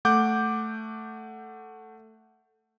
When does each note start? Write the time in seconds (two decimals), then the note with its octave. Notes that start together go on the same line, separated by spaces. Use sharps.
0.05 A3 F#5 D6 G6